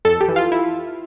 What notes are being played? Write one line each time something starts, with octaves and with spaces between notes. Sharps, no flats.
F2 A4
G4
E3
F4
E4